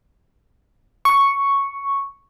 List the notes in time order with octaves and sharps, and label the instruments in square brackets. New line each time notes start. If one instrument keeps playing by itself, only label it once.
[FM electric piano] C#6